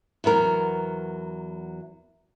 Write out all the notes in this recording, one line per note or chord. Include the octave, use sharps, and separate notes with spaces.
E2 F#3 B3 A#4